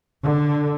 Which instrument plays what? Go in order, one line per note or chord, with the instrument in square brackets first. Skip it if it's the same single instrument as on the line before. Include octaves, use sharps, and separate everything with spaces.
[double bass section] D3